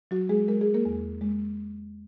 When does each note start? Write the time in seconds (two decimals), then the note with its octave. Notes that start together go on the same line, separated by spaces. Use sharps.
0.11 F#3 F#4
0.29 G#3 G#4
0.48 G#3 A#4
0.61 G#4
0.74 A#3 A#4
0.85 E2
1.21 G#3